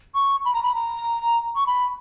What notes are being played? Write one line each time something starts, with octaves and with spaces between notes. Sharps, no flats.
C#6
B5
A#5
B5
A#5
C#6
B5